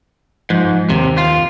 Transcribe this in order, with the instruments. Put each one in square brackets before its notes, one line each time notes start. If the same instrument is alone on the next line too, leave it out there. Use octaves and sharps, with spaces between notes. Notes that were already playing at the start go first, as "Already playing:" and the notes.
[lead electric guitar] G#2 [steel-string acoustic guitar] F3
[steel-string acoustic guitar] D#2 [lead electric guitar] C3
[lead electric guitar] F4